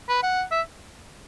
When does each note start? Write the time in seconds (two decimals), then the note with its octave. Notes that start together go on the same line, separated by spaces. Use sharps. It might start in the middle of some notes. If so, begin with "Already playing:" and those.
0.09 B4
0.23 F#5
0.51 E5